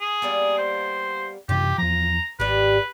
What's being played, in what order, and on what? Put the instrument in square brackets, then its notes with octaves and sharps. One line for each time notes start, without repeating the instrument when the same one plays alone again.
[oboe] G#4
[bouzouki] G3 A#3 B3
[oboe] C5
[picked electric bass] F#2 C3 E3 [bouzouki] F4 [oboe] G4
[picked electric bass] E2 F3 [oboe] A#5
[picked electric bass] G#1 [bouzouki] G3 G4 [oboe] B4